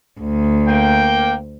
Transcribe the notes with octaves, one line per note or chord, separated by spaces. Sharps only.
D2
A#3 G5